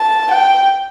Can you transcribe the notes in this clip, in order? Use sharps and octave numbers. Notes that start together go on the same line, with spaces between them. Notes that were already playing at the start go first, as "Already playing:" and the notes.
Already playing: A5
G5